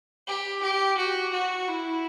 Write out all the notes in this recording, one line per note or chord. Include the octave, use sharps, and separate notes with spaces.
G4
G4
F#4
F#4
E4